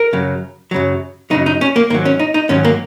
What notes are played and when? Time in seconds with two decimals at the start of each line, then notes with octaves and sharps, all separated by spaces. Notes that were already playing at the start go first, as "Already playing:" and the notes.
Already playing: A#4
0.13 F#2 C#3 F#3
0.71 F#2 C#3 F#3
1.30 F#2 C#3 F#3 D#4
1.46 D#4
1.61 C#4
1.76 A#3
1.90 G#2 D#3 F#3 A#3
2.05 C#4
2.19 D#4
2.34 D#4
2.49 G#2 D#3 F#3 C#4
2.65 A#3